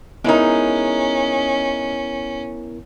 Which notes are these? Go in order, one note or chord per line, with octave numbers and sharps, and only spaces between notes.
G#3 B3 C#4 D#4 E4 A#4